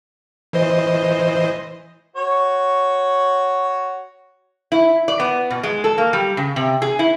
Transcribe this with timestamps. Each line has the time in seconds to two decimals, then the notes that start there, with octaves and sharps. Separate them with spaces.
0.53 E3 C5 D#5
2.16 F#4 C#5
4.72 E4
5.08 D5
5.20 B3
5.50 B2
5.63 G#3
5.84 A4
5.98 A#3
6.13 G3
6.37 C#3
6.56 C3
6.82 G#4
6.99 E4